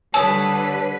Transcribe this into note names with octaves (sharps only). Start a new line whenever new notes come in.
D3 G3 B4 C#5 A5 D#6 E6